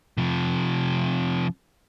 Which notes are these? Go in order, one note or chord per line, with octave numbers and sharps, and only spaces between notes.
C3 F3